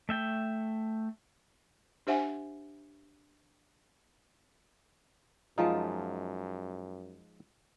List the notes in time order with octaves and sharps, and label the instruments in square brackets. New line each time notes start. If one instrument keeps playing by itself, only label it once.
[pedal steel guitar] A3 E5 G5
[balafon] D4 G4 C5 E5 F#5 G#5
[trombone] F#2 [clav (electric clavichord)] F3 G#3 D#4 [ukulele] F4 A5